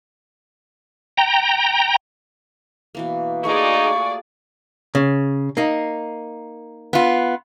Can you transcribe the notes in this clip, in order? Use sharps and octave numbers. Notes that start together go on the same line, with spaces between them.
G5 A#5
B2 E3 A#3
A3 A#3 D#4 F4 F#4 G#4 D5 C#6
C#3
A#3 D#4
B3 F4